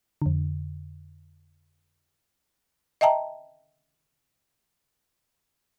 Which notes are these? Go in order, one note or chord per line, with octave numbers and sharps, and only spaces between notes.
F2 D3
D#5 E5 G5 A5 A#5